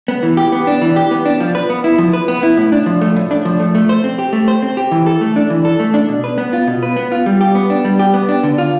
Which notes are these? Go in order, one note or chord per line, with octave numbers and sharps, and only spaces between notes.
B3
E3
G4
B3
D4
E3
G4
B3
D4
F3
B4
B3
E4
F3
B4
B3
E4
A2
D4
F3
A3
A2
D4
F3
A3
A3
C5
C4
G4
A3
C5
C4
G4
E3
A4
A3
D4
E3
A4
A3
D4
B2
B4
B3
F4
B2
B4
B3
F4
G3
G4
B3
D4
G3
G4
B3
D4
D3
F4